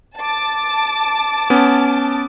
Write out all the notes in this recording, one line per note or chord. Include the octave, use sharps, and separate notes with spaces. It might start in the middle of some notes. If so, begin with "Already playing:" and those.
A5 D6
B3 C#4